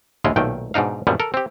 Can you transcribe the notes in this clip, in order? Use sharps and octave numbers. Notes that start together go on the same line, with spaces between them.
A#1 D#2 G#3 E4 F4
B1 A#2 D#3 A3 G5
G#2 B2 D4 D#4 F5
F#2 A#2 D3 G3 B3
A4 A#4
C4 G4